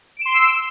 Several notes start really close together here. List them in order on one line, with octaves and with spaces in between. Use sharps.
D7 E7 C6 C7 E6